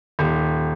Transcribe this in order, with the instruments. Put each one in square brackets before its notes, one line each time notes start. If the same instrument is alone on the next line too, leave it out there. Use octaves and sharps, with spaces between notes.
[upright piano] D#1